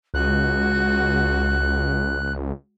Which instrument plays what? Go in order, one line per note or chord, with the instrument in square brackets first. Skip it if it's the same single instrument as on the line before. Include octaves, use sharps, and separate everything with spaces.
[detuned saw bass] C#2 [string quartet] G#3 F#4 [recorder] F#6